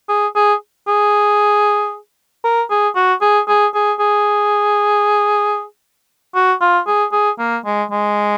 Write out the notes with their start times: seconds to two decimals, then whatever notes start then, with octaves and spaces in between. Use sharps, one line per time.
0.09 G#4
0.35 G#4
0.88 G#4
2.44 A#4
2.70 G#4
2.96 F#4
3.21 G#4
3.48 G#4
3.74 G#4
4.00 G#4
6.35 F#4
6.61 F4
6.87 G#4
7.12 G#4
7.39 A#3
7.65 G#3
7.91 G#3